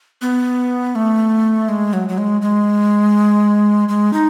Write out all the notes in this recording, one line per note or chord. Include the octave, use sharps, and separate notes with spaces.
B3
A3
G#3
F#3
F#3
G#3
G#3
G#3
D#4